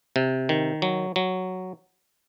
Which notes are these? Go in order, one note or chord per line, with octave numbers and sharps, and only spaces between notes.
C3
D#3
F#3
F#3